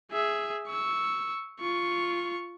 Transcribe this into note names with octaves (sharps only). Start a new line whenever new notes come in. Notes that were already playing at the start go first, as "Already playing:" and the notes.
G#4 E5
C#6 E6
F4 C#6